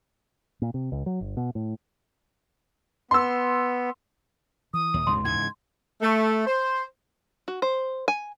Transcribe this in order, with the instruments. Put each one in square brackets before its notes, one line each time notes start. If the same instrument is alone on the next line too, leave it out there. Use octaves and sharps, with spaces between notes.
[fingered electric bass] A#2
C3
C#2
F#3
G1
B2
A2
[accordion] B3 [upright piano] C6 E6
[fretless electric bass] E3 [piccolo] D#6
[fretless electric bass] D#1 [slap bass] D#2
[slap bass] C#2 G#2 C3 [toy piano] C6
[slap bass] G#2 C#3 E3 [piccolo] G#6
[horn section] A3
C5
[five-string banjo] F#4
C5
G#5